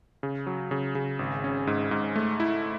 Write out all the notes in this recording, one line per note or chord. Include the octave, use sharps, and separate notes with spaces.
C#3
F#3
C#3
C#3
G#1
C#4
G#2
G#2
A3
E4